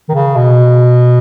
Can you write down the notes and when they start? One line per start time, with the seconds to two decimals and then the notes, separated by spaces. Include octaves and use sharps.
0.09 D#3
0.14 C#3
0.36 B2